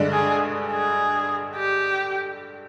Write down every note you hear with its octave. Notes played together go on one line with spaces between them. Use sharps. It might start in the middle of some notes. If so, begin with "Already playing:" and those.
Already playing: G2 D3 G#3 D4
G#4
G#4
G4